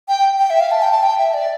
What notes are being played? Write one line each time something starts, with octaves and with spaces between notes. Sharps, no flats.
G5
G5
E5
F5
A5
G5
A5
G5
E5
D5